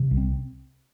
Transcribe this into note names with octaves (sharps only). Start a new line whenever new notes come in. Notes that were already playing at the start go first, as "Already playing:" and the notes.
Already playing: C3
C2
C4